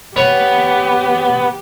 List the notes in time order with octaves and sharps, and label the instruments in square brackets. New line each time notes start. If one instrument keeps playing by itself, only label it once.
[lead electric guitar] B3 [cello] G4 [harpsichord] C#5